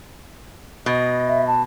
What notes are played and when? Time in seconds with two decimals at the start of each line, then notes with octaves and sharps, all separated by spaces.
0.86 B2 D#5
1.28 E5
1.47 A5